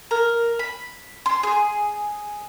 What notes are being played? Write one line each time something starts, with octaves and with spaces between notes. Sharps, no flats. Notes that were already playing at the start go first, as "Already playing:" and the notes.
A#4
B5
C6
G#4